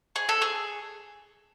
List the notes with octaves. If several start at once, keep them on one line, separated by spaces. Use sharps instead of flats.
G#4
A4
G#4